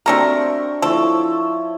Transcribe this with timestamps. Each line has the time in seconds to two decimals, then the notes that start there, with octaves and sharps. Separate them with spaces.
0.06 G3 A3 C4 D4 F#4 A#4
0.82 F3 E4 A4 C#5